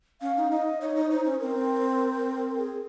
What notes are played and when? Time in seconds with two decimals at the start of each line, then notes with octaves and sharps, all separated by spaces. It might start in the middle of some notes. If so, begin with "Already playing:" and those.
0.21 C#4 F5
0.37 D#4
0.51 D#4 D#5
0.81 D#4 C#5
0.95 D#4
1.05 C#5
1.11 D#4 C5
1.25 C#4
1.40 C4 A#4
2.58 G#4